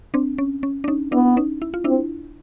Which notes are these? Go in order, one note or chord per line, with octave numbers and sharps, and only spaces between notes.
C4 D4
C#4
C#4
D4
C#4 D#4
B3 D4 E4
C#4 D#4
E4
F4
C4 D4 E4